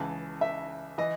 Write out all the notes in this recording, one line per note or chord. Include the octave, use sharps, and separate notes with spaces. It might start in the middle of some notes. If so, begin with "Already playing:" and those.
Already playing: C#2 C#3 E3 A5
E5
E3 D#5